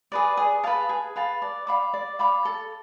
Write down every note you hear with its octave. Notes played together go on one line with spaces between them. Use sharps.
G#4 B4 D5
G#4
B4 F5 A5
G#4
B4 F5 A5
D5
F5 B5 D6
D5
F5 B5 D6
A4